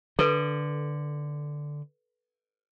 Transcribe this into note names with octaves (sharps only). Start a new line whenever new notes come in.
D3 A4 B4